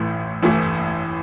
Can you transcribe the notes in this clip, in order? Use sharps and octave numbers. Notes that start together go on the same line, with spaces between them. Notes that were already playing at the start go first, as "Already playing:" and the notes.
Already playing: A1 A2 E3 A3
A1 A2 E3 A3